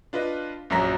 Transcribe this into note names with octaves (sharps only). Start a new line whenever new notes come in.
D4 F4 B4 D#5
A#1 F#2 F#3 A#5 B6